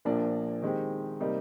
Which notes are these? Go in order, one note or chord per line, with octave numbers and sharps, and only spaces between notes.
A#1 A#2 F3 A#3 D4
D#3 G#3 C4 G4
C3 G3 A#3 D#4